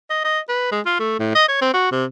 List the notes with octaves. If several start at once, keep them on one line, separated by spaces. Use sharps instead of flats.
D#5
D#5
B4
G#3
F4
A3
A2
D#5
C#5
C4
F#4
C3